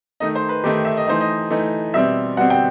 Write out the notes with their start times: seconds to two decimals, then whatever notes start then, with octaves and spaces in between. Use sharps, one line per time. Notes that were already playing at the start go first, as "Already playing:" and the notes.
0.20 D#3 A3 D#4 D#5
0.35 C5
0.49 B4
0.64 D#3 A3 D#4 G4
0.85 E5
0.97 D#5
1.07 E3 A3 D#4 C5
1.21 D#5
1.50 E3 A3 D#4
1.94 B2 G3 C4 E5
2.37 B2 G3 C4 F#5
2.50 G5